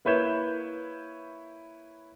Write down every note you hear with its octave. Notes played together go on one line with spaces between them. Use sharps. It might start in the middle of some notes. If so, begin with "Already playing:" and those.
A#3 E4 B4 C#5 G6 E7